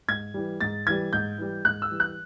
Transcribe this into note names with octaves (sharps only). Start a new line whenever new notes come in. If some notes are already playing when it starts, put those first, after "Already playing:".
G#2 G#6
E3 G3
G#2 A6
E3 G3 G#6
G#2 G6
E3 G3
G#2 F#6
E6
E3 G3
F#6